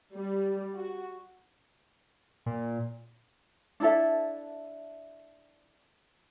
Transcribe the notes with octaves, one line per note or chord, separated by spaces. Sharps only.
G3
F#4
A#2
D4 E4 A4 E5